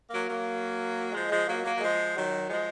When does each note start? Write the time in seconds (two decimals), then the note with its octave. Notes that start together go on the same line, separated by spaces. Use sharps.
0.10 F#3 A#3
0.27 F#3 A#3
1.12 F3 G#3
1.29 F3 G#3
1.46 F#3 A#3
1.63 F#3 A#3
1.74 F#3
1.80 F3 G#3
2.15 D#3 F#3
2.48 F3 G#3